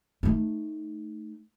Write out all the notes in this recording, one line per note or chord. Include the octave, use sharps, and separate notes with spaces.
A3 D#4